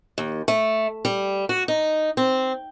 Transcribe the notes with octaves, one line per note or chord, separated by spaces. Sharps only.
D#2
A3
G3
F#4
D#4
C4